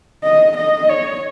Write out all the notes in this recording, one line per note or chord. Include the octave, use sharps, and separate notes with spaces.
D#5
D#5
C#5